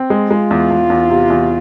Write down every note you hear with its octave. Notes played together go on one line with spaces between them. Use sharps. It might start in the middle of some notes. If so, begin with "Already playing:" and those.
Already playing: C4
G#3
G#3 F4
E2
E2
E2
C3
E2